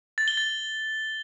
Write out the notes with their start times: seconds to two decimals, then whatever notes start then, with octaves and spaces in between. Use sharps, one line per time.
0.18 A6
0.28 G7
0.37 A6